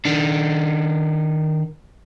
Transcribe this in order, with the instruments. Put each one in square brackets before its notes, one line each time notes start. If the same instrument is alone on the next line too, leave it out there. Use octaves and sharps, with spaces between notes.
[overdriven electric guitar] D#3 D4